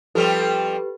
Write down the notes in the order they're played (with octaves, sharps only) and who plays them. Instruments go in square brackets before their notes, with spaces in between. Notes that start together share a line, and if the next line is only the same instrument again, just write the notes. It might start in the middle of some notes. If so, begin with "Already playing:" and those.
[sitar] F3 G3 C4 [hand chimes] G4 B4 [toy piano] A4